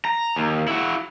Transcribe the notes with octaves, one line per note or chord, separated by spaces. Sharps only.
A#5
D#2
E4 F#4